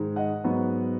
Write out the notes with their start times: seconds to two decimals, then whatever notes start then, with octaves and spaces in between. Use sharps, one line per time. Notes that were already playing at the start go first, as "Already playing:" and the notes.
Already playing: G#2 D#3 G#3
0.16 D#5 F#5
0.44 G#2 F#3 B3